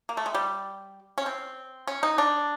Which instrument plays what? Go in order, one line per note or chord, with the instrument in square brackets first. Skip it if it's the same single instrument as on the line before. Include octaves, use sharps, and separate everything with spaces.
[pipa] A#3
A3
G#3
G3
C#4
C4
C#4
D#4
D4